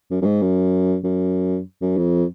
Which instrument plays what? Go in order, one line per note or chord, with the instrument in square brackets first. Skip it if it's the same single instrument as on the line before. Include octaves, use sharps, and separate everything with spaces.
[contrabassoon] F#2
F#2
G#2
F#2
F#2
F#2
F2